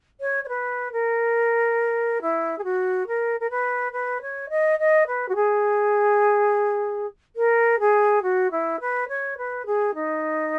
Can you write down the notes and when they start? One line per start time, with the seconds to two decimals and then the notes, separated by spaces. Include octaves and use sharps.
0.21 C#5
0.44 C#5
0.49 B4
0.92 A#4
2.22 E4
2.58 G#4
2.64 F#4
3.07 A#4
3.40 A#4
3.50 B4
3.92 B4
4.22 C#5
4.50 D#5
4.79 D#5
5.07 B4
5.28 F#4
5.35 G#4
7.36 A#4
7.80 G#4
8.22 F#4
8.51 E4
8.80 B4
9.08 C#5
9.38 B4
9.66 G#4
9.94 D#4